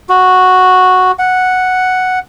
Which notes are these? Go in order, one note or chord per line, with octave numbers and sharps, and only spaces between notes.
F#4
F#5